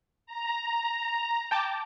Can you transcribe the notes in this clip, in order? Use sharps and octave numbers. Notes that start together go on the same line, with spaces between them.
A#5
G5 A5 D6